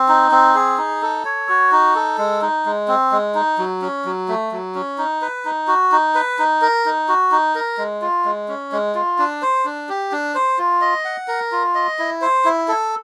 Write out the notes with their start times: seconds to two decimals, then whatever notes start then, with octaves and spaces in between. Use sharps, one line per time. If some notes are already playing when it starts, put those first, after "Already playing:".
Already playing: C4
0.09 D#4
0.32 C4
0.55 G#4
0.78 D#4
1.02 A4
1.25 C#5
1.49 F#4
1.72 D#4
1.95 A4
2.18 G#3
2.42 D#4
2.66 G#3
2.88 C4
3.12 G#3
3.35 D#4
3.58 F#3
3.82 C#4
4.05 F#3
4.28 A3
4.52 F#3
4.75 C#4
4.98 D#4
5.22 B4
5.45 D#4
5.68 F#4
5.92 D#4
6.15 B4
6.39 D#4
6.62 A#4
6.86 D#4
7.09 F#4
7.31 D#4
7.55 A#4
7.78 G#3
8.02 F4
8.25 G#3
8.48 C#4
8.72 G#3
8.95 F4
9.19 D4
9.42 C5
9.65 D4
9.89 G4
10.12 D4
10.35 C5
10.59 F4
10.81 D#5
11.05 F#5
11.28 A#4
11.52 F4
11.75 D#5
11.99 E4
12.22 C5
12.45 E4
12.68 A4